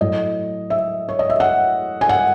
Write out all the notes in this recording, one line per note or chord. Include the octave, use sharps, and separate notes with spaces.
A2 F#3 D#5
E5
C#5
D#5
E5
F#5
G#5
F#5